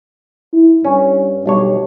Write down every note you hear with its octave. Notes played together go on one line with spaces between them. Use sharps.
E4
G2 C#4
B1 G3 D4 C#5